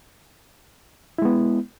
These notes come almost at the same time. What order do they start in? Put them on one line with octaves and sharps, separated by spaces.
E4 G#3 B3